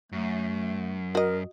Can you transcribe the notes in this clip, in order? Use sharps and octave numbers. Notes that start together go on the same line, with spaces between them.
F#2 A3
F#4 A#4 D#5